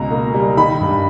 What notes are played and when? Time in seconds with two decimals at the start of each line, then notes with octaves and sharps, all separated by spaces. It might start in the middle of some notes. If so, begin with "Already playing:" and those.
Already playing: C#2 B2 A#5
0.11 A#3
0.34 G3
0.57 D#3 B5
0.81 G2